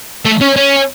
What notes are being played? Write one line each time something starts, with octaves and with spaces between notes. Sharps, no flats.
A3
C#4
C#4